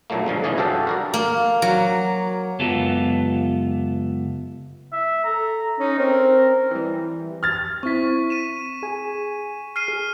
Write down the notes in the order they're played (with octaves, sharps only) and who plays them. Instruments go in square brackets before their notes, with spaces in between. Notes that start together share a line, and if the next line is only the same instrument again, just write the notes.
[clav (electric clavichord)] B1 F#2 A#2 F#3 A3 A#3
G2 D3 F3 G#3
C2 C3 E3 C#4 G#4 D5
G2 F#4 G4 A4 F5 A5
F#4 A#4 D5
[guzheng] A#3
F#3
[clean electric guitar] C#2 F#2 B3 F4 G4 A4
[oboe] E5
[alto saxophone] A4 [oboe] A#5
[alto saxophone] C#4 [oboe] D#4
[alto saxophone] C4 [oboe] A#4
[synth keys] E3 G3
[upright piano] F6 A6
[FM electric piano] C4 E4 [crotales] C#6 B6
[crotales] D#7 E7
[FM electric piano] G#4 G#5
[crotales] F6 C7 D#7
[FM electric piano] G#4